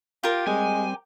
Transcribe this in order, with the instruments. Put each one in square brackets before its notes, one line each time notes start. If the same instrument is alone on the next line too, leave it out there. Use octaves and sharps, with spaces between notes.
[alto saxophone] F4 [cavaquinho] G4 A#4
[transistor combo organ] G3 C4 [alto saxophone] G#3 [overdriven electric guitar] G#5